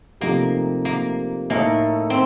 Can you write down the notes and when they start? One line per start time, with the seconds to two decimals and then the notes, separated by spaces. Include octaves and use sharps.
0.21 C3 F3 A3 A#3 D#4 G4
0.85 A#3
1.50 A2 A3 A#3 D#4 A4
2.10 C4